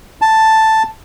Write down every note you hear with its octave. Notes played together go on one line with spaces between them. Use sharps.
A5